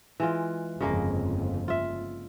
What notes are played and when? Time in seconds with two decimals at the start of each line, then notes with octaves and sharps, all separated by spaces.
0.20 E3 G#3 F4
0.81 G1 F2 C#3 G#3 A#3
1.68 F4 E5